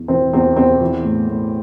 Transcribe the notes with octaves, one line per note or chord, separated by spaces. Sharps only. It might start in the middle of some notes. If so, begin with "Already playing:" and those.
Already playing: E2
E3 C4
E2 C4
E2 C4
E3
A2
A2